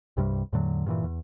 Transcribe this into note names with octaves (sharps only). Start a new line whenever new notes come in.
C2 G2 C3 G3
E2 A2 D3 F#3
G2 A#2 D3 E3
E2